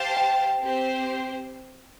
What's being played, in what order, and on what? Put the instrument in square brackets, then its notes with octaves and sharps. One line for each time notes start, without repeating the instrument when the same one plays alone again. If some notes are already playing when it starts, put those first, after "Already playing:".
Already playing: [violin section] G4 C5 F5 A5
[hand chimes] G5
[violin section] C4 G4 C5